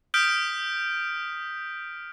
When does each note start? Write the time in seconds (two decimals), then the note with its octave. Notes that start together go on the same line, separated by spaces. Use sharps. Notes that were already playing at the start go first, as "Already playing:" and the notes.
0.14 D#6 F6 G6 B6 D7